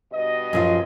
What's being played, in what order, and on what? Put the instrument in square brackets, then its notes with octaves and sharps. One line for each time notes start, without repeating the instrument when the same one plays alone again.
[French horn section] G2 B2 D#5
[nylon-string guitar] F#2 F3 F4